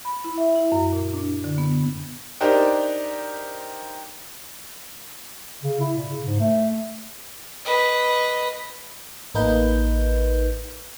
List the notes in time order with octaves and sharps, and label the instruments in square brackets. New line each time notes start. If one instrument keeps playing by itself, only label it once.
[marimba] B5
E4
E5
E4
F#2
A#2
D4
D3
B3
[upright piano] D4 D#4 G4 A#4 C5
[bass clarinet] C#3
E4
A#2
C#3
G#2
A3
[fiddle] B4 D#5
[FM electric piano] A1 A#3 D#4 B4 G6